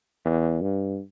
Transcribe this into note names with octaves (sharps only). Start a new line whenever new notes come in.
E2
G2